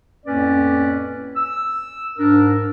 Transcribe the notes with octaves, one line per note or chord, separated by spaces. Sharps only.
F2 A2 A#3 C#4 B4 D5
E6
G#2 D4 A#4